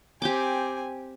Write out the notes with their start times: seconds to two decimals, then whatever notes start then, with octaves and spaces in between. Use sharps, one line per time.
0.22 C4 G4 G5 G#5 D6